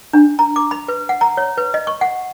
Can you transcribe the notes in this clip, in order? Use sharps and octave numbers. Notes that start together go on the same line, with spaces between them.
D4
A#5
D6
B5
B4
F#5
A#5
C#5
B4
D#5
C#6
F#5